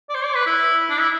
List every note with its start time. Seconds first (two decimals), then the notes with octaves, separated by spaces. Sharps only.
0.09 D5
0.15 C5
0.25 D5
0.35 B4
0.46 E4
0.90 D4
1.00 E4